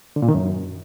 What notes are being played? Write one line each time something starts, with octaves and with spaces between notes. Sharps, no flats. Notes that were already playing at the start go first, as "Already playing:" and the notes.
D3
A#2
D#3
F#2